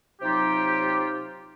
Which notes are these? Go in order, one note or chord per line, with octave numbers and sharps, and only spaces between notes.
C3 F#3 D#4 F4 G4